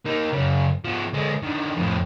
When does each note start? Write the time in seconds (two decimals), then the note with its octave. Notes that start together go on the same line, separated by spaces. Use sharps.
0.06 A#3 D#4
0.33 F#2 C#3
0.85 F3 B3
1.13 D3 G#3
1.43 D3 D#3
1.77 F2 A2